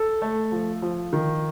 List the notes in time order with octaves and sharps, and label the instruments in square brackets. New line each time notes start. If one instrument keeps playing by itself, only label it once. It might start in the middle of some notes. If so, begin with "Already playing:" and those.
Already playing: [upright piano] A4
A3
F3
F3
D#3